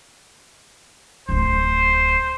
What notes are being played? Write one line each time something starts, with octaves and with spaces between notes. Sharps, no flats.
D1 D2 C5